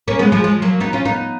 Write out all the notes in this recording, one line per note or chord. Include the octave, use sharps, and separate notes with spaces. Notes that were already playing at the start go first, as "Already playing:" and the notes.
A#3 C#4
G#3 B3
F3 G#3
F3 G#3
F#3 A#3
B3 D#4
C#4 F4
B3 D#4